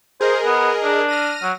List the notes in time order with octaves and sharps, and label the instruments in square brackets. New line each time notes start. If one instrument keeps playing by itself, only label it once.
[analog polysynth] G#4 A#4 D#5 [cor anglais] C5
[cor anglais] B3
D4
[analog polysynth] F6 A#6 D#7
[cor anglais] F#3